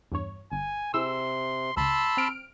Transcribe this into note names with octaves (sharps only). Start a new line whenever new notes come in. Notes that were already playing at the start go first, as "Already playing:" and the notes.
E2 G2 C#5
G1 G#5
C3 E4 G#4 C6 E6
C#2 C#3 A5 B5 C6 E6
C4 F6 D7